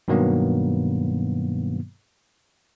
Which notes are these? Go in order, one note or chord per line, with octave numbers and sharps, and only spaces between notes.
G2 B2 D#3 F#3 A#3 B3